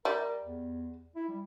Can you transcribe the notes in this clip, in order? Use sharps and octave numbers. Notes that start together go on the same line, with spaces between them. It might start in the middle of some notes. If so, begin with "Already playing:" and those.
G3 A#4 E5
E2
E4
G3